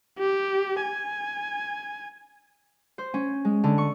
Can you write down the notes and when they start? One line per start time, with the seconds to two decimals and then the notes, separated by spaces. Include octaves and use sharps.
0.19 G4
0.82 G#5
2.98 C5
3.14 C#4
3.45 G#3
3.64 D3
3.78 C#6